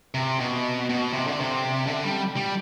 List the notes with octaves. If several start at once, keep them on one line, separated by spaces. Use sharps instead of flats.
C3
B2
B2
C3
D3
C3
D3
G3
G3